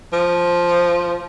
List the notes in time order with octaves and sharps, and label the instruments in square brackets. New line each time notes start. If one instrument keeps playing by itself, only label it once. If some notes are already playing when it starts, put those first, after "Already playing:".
[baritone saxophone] F3